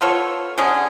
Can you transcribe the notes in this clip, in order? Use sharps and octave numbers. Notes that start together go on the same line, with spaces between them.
B3 F4 A4 C#5
D3 F#3 C#4 G#4